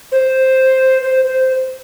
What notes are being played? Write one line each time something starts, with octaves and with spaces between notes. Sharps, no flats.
C5
C5
C5